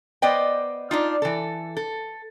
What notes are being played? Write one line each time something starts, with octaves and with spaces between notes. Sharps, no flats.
B3 B4 C5 D5 D#5 G5
D4 D#4 F4
E3 A4
A4